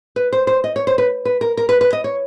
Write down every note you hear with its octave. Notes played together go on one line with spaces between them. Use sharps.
B4
C5
C5
D#5
C#5
C5
B4
B4
A#4
A#4
B4
B4
D#5
C#5